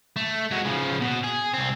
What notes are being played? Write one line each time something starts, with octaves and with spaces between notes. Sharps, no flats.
A3
G#3 F#4
C#3 F3
B2
G#4
C2 C4